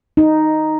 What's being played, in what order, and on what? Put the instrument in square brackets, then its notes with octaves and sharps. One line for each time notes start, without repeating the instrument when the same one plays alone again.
[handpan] D#4